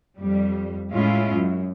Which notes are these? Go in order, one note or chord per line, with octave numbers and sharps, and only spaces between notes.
F2 G3
A2 G#3 C#4 E4 F4
F#2